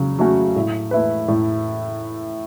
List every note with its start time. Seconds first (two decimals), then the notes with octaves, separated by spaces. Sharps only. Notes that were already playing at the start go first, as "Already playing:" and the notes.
Already playing: C#3 F#3
0.19 F#3 A3 C#4 F#4
0.56 A2
0.91 A3 E4 B4
1.28 A2